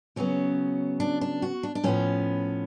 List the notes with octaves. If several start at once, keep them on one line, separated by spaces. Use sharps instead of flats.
C#3 F#3 B3 C#4
D4
D4
F#4
D4
D4
A2 F3 B3 C#4